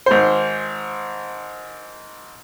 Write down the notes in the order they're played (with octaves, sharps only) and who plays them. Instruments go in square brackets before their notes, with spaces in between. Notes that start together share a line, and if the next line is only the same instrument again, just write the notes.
[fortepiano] G#1 C5